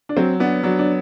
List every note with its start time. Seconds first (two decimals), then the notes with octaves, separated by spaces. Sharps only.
0.09 D4
0.17 F#3 C4
0.40 B3 D4
0.63 F#3 D4
0.79 D4